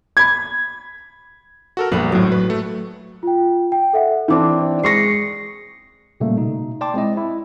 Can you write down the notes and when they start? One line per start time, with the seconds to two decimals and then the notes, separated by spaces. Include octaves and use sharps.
0.17 B5 G#6
1.77 F#4 A4 A#4
1.92 A#1 G3 B3 B4
2.12 G#1 A2 F#3
2.32 B4
2.50 A3
3.23 F4 G5
3.72 G5
3.93 A4 E5 F#5
4.28 E3 C4 D4 D#4 D6
4.59 D5
4.84 G#3 C#6 A#6 C7 C#7
6.20 A#2 C#3 G3 A3 A#3
6.37 B2 D#4
6.81 D5 G5 A5 C6 D6
6.94 G#3 C4 E4 D#5
7.17 E4